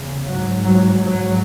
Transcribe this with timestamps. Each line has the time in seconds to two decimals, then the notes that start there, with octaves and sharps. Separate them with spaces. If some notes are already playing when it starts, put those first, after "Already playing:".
Already playing: E2 C#3
0.26 G#2 F#3
0.65 F#3
1.04 G#2 F#3